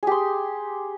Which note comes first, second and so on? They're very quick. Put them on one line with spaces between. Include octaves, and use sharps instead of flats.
G#4 G4 C6